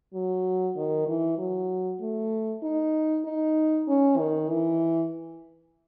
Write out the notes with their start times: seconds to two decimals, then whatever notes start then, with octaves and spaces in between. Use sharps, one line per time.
0.14 F#3
0.76 D#3
1.07 E3
1.38 F#3
2.01 A3
2.63 D#4
3.25 D#4
3.88 C#4
4.18 D#3
4.50 E3